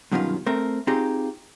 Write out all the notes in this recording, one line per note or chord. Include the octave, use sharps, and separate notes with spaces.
G2 B2 D#3 F#3 C#4 F4
A3 C4 A#4
C4 D#4 F4 G4 G#4 A#5